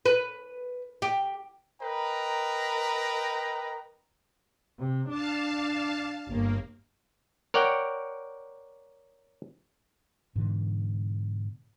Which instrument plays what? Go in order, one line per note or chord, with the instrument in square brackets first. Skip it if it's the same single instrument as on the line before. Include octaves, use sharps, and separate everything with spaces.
[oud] B4
G4
[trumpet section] A#4 B4 D#5 G5 A#5
[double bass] C3
[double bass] D4 [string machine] F5 A5
[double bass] G1 [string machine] A#3
[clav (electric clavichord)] A#4 C#5 D5 F#5 G5
[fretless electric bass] G#2 B2 D3 E3